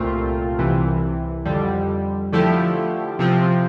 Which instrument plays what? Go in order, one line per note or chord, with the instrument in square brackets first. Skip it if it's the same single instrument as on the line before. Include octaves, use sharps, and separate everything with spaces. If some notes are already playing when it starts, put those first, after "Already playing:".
Already playing: [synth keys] C2 A#2 A3 C4 F4
C2 C3 E3
F2 D3 G3
D3 F3 A3 E4 G4
C3 F3 C4